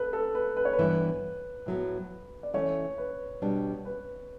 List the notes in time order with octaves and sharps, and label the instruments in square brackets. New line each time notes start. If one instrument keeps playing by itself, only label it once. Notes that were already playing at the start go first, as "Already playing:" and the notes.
Already playing: [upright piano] A4 B4
A4
B4
B4
C#5
B4
[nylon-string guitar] G2 E3 B3 E4
A2 F#3 B3
[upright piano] D5
[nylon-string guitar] E3 A3 C#4 [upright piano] C#5
[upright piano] B4
[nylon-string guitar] B2 G3 B3 D4
[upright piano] B4